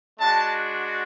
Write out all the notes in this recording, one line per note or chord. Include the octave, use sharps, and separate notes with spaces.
G#3 D4 F#4 A5